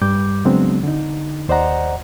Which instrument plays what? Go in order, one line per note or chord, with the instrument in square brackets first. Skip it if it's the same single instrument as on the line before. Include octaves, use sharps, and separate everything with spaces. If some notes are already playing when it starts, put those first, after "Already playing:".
[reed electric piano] G2 G3 D6 G6
C#3 F#3 G#3 B3 C4 D4
D3 D#4
D#2 C5 D5 D#5 F#5 A#5